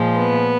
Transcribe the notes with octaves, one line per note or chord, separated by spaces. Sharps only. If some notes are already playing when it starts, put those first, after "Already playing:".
Already playing: A#2 F3 G#3
B3